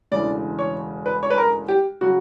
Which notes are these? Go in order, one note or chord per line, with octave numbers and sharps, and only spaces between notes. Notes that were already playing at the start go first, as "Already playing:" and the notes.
E1 D2 C#3 E3 D5
C#5
B4
C#5
B4
A#4
G4
C#3 F#3 F#4